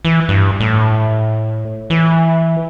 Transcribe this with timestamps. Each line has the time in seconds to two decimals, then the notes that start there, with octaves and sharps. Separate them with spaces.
0.05 E3
0.29 G2
0.60 A2
1.90 E3